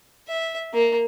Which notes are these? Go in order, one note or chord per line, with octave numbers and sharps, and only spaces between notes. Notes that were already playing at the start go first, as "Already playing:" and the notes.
E5
A#3